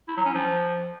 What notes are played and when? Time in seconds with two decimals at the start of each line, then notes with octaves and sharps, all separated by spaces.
0.08 E4
0.17 F#3
0.25 C#4
0.34 F3